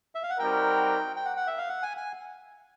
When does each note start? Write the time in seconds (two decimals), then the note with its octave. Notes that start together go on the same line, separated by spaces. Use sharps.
0.15 E5
0.23 F5
0.30 F#5
0.39 G3 C4 D#4 F#4 A#4 G5
1.16 G5
1.25 F#5
1.37 F#5
1.47 E5
1.58 F5
1.69 F#5
1.83 G#5
1.97 G#5